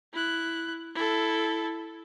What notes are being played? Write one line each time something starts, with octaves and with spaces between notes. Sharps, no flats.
E4 F#6
E4 A4